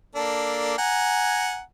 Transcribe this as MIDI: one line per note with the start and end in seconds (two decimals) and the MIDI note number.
0.15 0.76 58
0.15 0.76 62
0.15 0.76 69
0.78 1.60 78
0.78 1.60 80
0.78 1.60 82